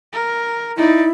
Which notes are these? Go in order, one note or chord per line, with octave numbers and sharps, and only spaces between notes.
A#4
D#4 E4 D5